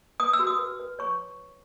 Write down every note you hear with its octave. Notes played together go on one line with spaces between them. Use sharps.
B4 D#6
E6
F#4
D#6
B4
B4
C#5 C#6